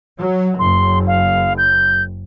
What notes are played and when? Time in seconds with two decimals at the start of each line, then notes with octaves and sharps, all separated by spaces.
0.18 F#3
0.59 F#1 C6
1.07 F5
1.58 G6